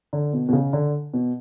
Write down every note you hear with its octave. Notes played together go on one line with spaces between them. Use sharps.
D3
B2
B2
C#3
D3
B2